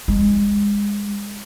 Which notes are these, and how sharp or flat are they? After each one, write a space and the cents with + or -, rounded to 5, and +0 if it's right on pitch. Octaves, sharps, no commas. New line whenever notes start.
G#3 -25